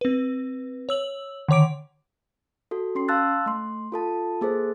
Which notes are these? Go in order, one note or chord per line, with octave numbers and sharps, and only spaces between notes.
C4 B4
C#5 E6 F#7
D3 D#3 C#5 D6 D7
F#4 A4
C#4 C6 C7
F5 A5 C6 E6 F#6 A6
A3 C6
F4 A4 A5
A#3 G#4 A4 C5